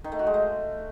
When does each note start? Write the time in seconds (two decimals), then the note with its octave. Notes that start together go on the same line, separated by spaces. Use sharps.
0.04 D#3
0.12 A3
0.19 F#4
0.27 G#3
0.34 A3